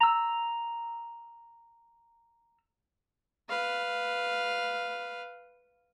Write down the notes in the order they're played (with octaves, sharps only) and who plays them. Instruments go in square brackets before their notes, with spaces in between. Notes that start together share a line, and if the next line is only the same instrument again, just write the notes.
[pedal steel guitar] A#5 E6
[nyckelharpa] B4 F5